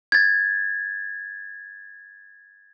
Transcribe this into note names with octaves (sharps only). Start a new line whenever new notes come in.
G#6 A6